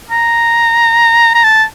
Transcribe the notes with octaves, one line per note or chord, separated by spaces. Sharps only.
A#5
A#5
A5